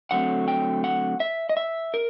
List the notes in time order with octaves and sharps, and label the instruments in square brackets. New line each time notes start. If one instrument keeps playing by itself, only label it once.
[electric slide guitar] D3 F#3 A3 C4 F#5
G5
F#5
E5
D#5
E5
A#4